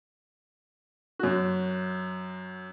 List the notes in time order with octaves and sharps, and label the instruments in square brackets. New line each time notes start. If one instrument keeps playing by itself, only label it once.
[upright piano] F#2 F#4